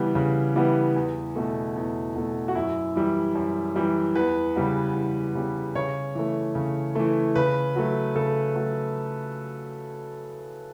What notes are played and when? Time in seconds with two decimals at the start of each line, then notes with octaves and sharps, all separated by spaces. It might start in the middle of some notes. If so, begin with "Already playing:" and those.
Already playing: C#3 E3 G3 B3
0.15 C#3
0.56 E3 G3 B3
0.96 E2
1.36 B2 A3
1.76 E2
2.15 B2 A3
2.48 F#4
2.55 F#2 E4
2.96 E3 G3
3.35 F#2
3.76 E3 G3
4.15 E2 B4
4.56 C#3 G3 B3
4.95 E2
5.35 C#3 G3 B3
5.75 C#3 C#5
6.15 E3 A3
6.55 C#3
6.95 E3 A3
7.35 C#3 B4
7.76 F#3 A3
8.15 C#3 A4
8.55 F#3 A3